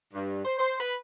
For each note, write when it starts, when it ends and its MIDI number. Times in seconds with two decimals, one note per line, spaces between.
0.14 0.41 43
0.45 0.56 72
0.59 0.77 72
0.80 0.96 71